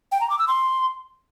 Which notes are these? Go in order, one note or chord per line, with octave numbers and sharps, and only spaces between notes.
G5
A#5
D6
E6
C6